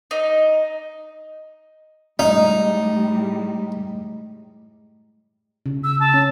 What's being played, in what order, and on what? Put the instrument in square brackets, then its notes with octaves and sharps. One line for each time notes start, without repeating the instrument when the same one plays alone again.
[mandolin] D#4 D#5
[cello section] A2 G3 G#3 [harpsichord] D#4
[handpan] C#3
[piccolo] E6
A5
[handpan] C#4